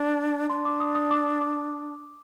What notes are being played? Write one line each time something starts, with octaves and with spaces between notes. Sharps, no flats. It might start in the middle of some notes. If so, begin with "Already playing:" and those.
Already playing: D4
D4 C6
D6
D#6
D#6
D6
D6